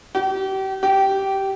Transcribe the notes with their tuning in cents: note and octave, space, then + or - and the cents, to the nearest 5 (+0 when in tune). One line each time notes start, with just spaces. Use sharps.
G4 -35
G4 -15